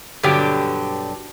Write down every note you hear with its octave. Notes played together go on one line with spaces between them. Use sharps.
G2 B2 D3 F#3 D4 G4